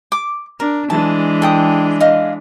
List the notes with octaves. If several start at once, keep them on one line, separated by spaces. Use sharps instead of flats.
D6
D4 A#4
E3 G#3 D4 A5
A4 G5 D#6
D#5 F5